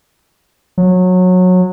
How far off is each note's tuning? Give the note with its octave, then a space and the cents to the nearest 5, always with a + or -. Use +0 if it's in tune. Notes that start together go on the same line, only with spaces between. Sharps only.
F#3 -20